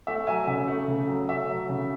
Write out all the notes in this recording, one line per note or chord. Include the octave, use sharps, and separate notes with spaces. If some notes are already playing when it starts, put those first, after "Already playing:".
A3 E5
F#3 E5 G#5
C#3 E5
A3
C#3
F#3
A3 E5
F#3
C#3